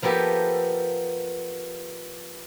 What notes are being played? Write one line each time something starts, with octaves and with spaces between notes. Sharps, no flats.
F3 A#3 B3 G4 A4